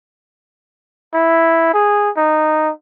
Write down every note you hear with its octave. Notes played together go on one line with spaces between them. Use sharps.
E4
G#4
D#4